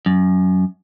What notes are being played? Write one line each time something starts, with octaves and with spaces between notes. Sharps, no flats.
F#2